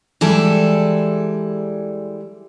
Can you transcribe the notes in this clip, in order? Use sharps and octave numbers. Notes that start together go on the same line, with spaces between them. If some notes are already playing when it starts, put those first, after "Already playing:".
E3 G3 G#3 A4